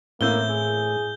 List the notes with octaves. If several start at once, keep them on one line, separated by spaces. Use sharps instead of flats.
A2 E3 A#3 C4 E4 G6 G7
G#4